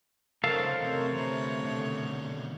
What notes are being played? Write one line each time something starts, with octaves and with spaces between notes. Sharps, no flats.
C#3 F#3 D#4 A4 A#4 C5 F5
E2 C3 A3 C4 C#5
D2 B4
B2 D3 D#3